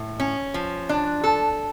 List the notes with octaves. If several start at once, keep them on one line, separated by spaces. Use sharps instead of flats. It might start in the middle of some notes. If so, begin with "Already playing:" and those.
Already playing: A2
C#4
F3
D4
A4